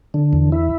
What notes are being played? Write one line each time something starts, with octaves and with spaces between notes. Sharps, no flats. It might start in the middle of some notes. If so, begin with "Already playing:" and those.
D3
E2
E4